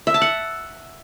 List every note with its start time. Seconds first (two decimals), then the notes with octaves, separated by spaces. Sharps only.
0.07 E5
0.14 A5
0.22 F#5